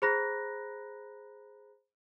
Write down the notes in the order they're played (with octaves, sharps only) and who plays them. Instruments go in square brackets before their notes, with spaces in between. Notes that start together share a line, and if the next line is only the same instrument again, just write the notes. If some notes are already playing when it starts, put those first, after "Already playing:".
[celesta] G#4 C5 A#5 B5 F#6 A#6